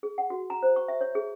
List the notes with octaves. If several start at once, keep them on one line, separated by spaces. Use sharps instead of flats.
G#4
F#5
F#4
A#5
C5
C#6
E5
C#5
G#4